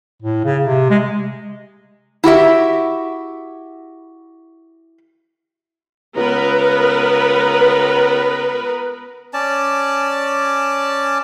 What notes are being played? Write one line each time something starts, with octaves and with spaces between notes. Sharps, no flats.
A2
C#3
C3
G#3
E4 F#4 G4 E5
C#2 B3 A#4 B4
C#4 D5 A5